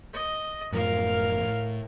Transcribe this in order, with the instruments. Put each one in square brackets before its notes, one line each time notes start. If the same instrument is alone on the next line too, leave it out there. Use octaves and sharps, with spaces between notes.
[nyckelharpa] D#5
[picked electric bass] F#2 A2 F3 [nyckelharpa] A#4 F5
[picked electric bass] A2